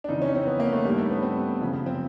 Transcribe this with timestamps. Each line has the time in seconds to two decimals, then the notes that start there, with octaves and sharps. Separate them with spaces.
0.04 D4
0.08 F2 C#3 E3 D#4
0.22 C#4
0.35 C4
0.47 B3
0.60 A#3
0.73 A3
0.85 G2 D#3 G3
0.98 A3
1.11 B3
1.22 C4
1.61 F#2 C#3 F3
1.86 C4